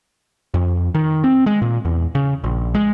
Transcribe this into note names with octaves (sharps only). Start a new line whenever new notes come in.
F2
D#3
C4
G#3
A#2
E2
C#3
A#1
G#3